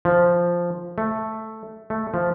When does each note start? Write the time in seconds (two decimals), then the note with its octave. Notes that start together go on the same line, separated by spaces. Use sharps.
0.05 F3
0.98 A3
1.90 A3
2.14 F3